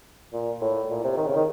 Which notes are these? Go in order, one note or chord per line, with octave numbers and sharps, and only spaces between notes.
A#2
A2
A#2
C3
D#3
C#3
D#3